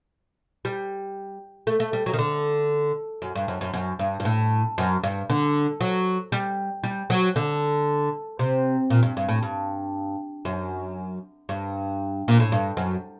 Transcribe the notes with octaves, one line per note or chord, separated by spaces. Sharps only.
G3
A3
A3
G3
F#3
D#3
D3
F#2
G2
F#2
F#2
F#2
G2
G2
A2
F#2
G2
D3
F#3
G3
G3
F#3
D3
C3
A#2
G2
G2
A2
G2
F#2
G2
A#2
A2
G2
F#2